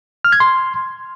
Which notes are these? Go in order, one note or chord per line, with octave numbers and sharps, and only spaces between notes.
F6
G#6
C6